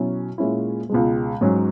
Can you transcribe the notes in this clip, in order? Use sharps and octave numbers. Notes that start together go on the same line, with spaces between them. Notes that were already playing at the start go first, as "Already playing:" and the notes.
Already playing: B2 F#3 C#4 E4
A#2 G#3 C#4 E4
C#2 B2 G#3
G#2 F#3 C#4